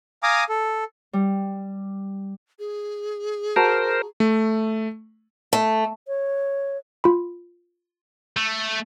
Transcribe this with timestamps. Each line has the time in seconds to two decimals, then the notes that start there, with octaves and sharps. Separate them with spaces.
0.23 F5 G#5 A#5 D6 D#6
0.49 A4
1.13 G3
2.59 G#4
3.56 F#4 A#4 C5 A5 A#5
4.20 A3
5.53 A3
6.08 C#5
7.04 F4 B5
8.37 A3